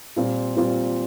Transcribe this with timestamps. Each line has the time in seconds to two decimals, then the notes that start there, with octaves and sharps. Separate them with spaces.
0.16 A#2 G3 C4 F4
0.56 A#2 G3 C4 F4